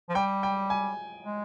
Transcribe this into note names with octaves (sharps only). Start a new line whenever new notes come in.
F3
G3 G5
G5
G#5
G#3